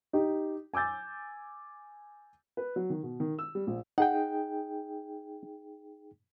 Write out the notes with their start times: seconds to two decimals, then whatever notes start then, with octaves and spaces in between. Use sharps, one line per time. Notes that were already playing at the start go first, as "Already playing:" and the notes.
0.13 D#4 G4
0.74 G#5 D6 E6 G6 A6
2.57 B4
2.76 F#3
2.90 D#3
3.03 B2
3.20 D#3
3.39 E6
3.55 G3
3.67 A#1
3.98 D#4 G#4 F#5 G5